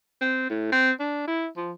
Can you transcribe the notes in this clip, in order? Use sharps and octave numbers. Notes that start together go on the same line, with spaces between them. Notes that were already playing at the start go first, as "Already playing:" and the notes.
C4
A2
C4
D4
E4
F3